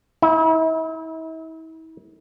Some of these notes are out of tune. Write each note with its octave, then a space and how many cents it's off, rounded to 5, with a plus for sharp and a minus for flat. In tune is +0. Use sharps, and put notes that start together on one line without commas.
E4 -40